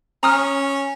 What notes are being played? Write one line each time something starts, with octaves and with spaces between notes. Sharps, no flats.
C#4 A#5 D#6 F6